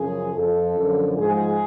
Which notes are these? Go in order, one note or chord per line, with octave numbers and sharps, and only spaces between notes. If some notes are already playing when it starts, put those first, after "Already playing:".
Already playing: F#2 C#3 F3 G#4
F2 F3 A4
F#2 D3 F3
G#2 F3 G#4